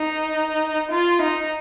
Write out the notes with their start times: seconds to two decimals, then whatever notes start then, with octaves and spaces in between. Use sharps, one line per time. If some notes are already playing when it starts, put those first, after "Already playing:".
Already playing: D#4
0.91 F4
1.22 D#4